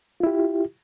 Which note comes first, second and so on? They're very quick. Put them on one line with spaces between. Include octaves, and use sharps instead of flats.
F4 E4 G4